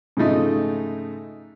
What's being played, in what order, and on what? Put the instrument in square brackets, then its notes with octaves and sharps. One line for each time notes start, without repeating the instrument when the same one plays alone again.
[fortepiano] G#2 C#3 F3 A3 D#4